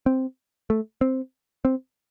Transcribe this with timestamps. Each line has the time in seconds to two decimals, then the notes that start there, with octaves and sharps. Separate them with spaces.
0.06 C4
0.70 A3
1.01 C4
1.65 C4